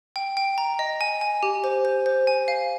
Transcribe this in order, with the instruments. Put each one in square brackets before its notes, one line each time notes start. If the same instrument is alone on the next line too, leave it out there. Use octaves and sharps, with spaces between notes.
[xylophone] G5
G5
A#5
D#5
G#5
G#5
G4
C5
C5
C5
G#5
F5